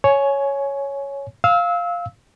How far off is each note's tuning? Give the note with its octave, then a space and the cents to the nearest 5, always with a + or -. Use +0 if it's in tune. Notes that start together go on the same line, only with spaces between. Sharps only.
C#5 +0 G#5 +20
F5 +0 E6 -25